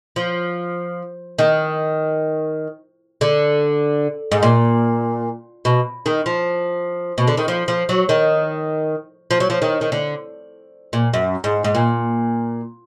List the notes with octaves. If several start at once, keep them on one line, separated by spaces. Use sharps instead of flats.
F3
D#3
D3
G#2
A#2
B2
D#3
F3
B2
D3
D#3
F3
F3
F#3
D#3
F3
F#3
F3
D#3
D#3
D3
A#2
F#2
G#2
G#2
A#2